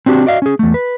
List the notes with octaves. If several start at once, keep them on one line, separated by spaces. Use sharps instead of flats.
C4 D4 F#4 G4
F#4 D5 D#5 F5
C#4 G#4
E2 A3
B4